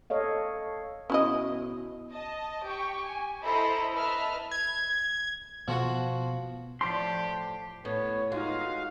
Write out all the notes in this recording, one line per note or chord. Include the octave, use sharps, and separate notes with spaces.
A4 C#5 D#5 F5
B2 C#4 E4 D#5
D#5 A5
G4 G5 C#6
G#5
E4 A4 C5 D#5 A#5 B5
B4 D#5 E5 A5 F6
G#6
B2 F3 F#4
A2 F3 G4 D5 A5 C6 B6 C7
A2 B3 C#5
G#3 D#4 F4 F#4 F5